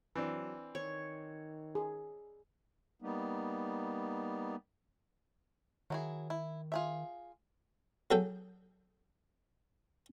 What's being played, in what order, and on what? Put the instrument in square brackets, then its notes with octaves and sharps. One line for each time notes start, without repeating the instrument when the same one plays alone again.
[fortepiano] E3 C4 D4 [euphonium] F#3
[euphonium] D#3 [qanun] C#5
[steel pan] G#4
[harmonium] G3 A#3 B3 D#4
[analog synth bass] D#3 [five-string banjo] F#3 E4 G#4
[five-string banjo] E4
F4 G#4 E5
[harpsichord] F#3 G#4 A4 G5